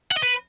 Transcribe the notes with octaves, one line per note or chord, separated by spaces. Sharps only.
F#5
D#5
B4